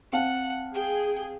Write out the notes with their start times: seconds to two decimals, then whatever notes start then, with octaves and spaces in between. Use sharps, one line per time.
0.13 C4 F5 F#5 A5
0.75 G#4 G5